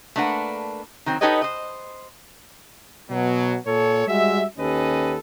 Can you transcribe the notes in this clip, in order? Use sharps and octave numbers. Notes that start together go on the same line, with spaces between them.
A3 A#3 D4 B4 F#5
D#3 F#3 C4
D#4 G4 A4 B4 C#5 D#5
C5 D#5
B2 F#3
A#2 A4 C#5
G3 G#3 F#4 E5
D#2 C#4 G4 A4 B4 D#5